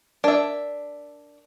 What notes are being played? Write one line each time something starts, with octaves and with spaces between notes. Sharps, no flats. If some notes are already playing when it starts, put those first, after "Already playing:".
D4 A#4 D5 E5